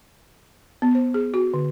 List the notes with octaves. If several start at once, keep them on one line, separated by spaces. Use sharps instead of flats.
B3
C5
G#4
F#4
D3